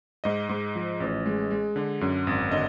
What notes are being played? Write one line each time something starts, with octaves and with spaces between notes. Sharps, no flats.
G#2 D#5
G#2
F3
A1
G#3
G#3
D3
F#2
G#1
D3 D#5